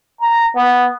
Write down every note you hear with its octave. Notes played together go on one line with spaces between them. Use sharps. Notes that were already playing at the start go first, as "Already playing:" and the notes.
A#5
B3